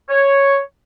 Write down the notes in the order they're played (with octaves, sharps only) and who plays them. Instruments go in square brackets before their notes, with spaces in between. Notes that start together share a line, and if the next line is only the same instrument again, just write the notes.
[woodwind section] C#5